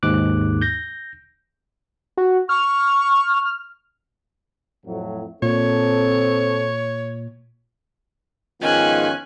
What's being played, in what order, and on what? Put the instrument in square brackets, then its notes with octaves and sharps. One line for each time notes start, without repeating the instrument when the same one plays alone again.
[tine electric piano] D#2 G#2 D6 F#6
G6 A#6
[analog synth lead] F#4
[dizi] C#6 [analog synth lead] F6
[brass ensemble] F2 A2 F#3
[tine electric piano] A#2 [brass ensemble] C4 A4 [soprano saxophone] C#5
[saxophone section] G#2 D#3 [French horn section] F3 B3 F4 [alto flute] C#4 [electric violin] G#5 F#6